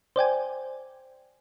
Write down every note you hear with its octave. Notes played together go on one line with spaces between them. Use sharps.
C5 D5 G5 G#5